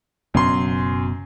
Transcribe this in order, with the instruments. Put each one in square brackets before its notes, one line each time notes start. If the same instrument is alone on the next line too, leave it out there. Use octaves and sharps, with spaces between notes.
[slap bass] F#1 B2 B3 [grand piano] F#2 C6